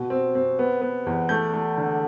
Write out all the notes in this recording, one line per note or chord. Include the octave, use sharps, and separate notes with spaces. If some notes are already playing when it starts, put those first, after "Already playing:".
Already playing: B2
C4
C4
B3
B3
E2
A3 G6
A3
D3